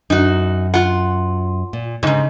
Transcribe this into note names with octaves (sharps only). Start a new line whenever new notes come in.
F#2 D#4 F#4
F4 F#5
A#2
F2 G#2 C#3 D#4